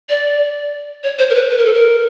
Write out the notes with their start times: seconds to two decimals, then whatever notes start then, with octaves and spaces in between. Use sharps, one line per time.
0.10 D5
1.03 C#5
1.19 C5
1.30 A#4
1.35 B4
1.50 B4
1.58 A#4
1.65 A4
1.74 A#4